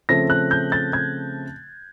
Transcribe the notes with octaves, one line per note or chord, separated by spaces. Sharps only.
C#3 F3 A3 C4 A#6
F#6
G6
A6
G#6